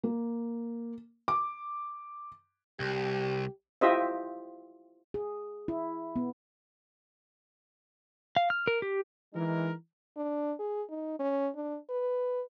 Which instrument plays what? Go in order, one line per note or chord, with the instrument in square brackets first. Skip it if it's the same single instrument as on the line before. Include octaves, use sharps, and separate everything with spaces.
[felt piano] A#3
D6
[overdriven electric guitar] C2 [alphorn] G4
[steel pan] E4 F4 G4 C5 D#5 E5
[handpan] G#4
E4
B3
[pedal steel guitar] F5
F6
A#4
G4
[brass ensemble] E3 G#3 D#4 A#4
[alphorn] D4
G#4
D#4
C#4
D4
B4